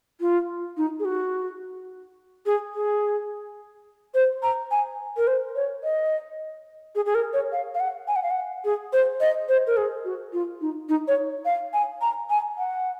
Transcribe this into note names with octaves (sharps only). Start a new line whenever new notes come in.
F4
D#4
G#4
F#4
G#4
G#4
C5
A#5
G#5
A#4
C5
C#5
D#5
G#4
G#4
A#4
C#5
F5
F5
F#5
G#5
F#5
F5
F#5
G#4
C5
D#5
C5
A#4
G#4
F#4
F4
D#4
D#4
C#5
F5
G#5
A#5
G#5
F#5